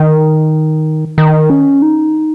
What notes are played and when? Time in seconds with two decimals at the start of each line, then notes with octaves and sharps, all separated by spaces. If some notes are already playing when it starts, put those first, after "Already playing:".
Already playing: D#3
1.18 D#3
1.50 C#4
1.82 D#4